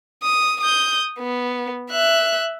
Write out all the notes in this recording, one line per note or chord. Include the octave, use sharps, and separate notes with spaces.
D#6
D#6 G6
B3
E5 F#6